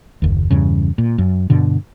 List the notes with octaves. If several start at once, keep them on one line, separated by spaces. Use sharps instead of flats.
F#1 D#2
E2 G2 C#3
A#2
F#2
G2 B2 D3